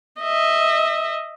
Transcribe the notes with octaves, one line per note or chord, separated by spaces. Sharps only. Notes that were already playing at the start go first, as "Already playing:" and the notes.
D#5 E5